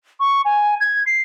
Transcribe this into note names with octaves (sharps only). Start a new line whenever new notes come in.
C#6
G#5
G#6
C7